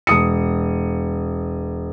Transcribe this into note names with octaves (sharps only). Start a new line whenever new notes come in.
E1 D#6 C#7